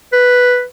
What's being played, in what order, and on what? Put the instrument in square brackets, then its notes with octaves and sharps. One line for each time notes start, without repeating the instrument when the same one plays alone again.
[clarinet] B4